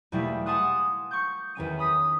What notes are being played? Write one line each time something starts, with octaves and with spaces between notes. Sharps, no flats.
E2 B2 G3 A3 A#3 E4
F#5 G#5 A5 C6 D#6 F#6
C#6 D6 G6
E2 D#3 C#4 D#7
B5 D#6 B6